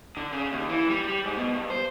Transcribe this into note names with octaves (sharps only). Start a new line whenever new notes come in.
D3
C#3
D#2
E3
G3
G3
G#2
B2
G2
C5